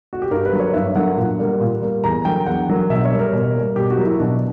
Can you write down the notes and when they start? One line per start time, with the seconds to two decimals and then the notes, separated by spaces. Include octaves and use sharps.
0.13 F#4
0.22 G4
0.31 G2 A#4
0.46 B4
0.52 D3 F#3 A#3
0.60 C#5
0.73 G2 E5
0.95 D3 F#3 A#3 F#5
1.17 A#2
1.39 G3 A#3
1.60 A#2
1.82 G3 A#3
2.04 E2 A#5
2.25 D3 F#3 A#3 G5
2.46 E2 F#5
2.68 D3 F#3 A#3
2.90 B2 E5
3.05 C#5
3.12 G3 A#3
3.19 A#4
3.33 B2
3.55 G3 A#3
3.76 B2 G4
3.90 F#4
3.98 F#3 A#3
4.05 E4
4.20 B2 D4